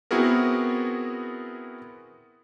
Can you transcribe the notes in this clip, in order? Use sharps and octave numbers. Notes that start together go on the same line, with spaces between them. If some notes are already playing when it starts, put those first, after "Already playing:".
B3 C4 E4 F#4 G#4 A#4